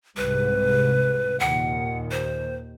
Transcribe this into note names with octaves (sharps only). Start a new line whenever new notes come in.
C2 G#2 C3 B4
D#2 A#2 D#3 F#5
C5